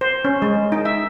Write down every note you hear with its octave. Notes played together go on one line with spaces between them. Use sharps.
C5
C#4
G#3
D#4
E5